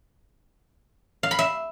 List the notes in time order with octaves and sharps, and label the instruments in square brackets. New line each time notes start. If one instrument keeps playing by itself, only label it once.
[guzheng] F5
B5
E5